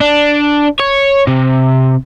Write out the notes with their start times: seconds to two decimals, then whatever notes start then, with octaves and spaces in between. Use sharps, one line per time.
0.01 D4
0.80 C#5
1.27 C3